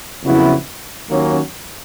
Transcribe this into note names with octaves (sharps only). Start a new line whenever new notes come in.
F2 C#3 F#3 B3 E4
D#2 D#3 F#3 A#3 C#4